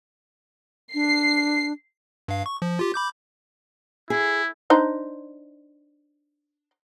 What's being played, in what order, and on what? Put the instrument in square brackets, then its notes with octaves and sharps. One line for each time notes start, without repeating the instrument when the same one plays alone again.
[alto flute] D4 [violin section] C7
[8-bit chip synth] G2 F5
C#6
F3
F4 G4
B5 D6 G6
[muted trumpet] E4 [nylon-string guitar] G#4
[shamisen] D4 D#4 C5